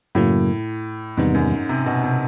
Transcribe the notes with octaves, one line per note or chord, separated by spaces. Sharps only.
F#2 A2 C#3 F#3 A#3
E2 G#2 C3 D#3 G3 B3
F#2
C3
B2
C3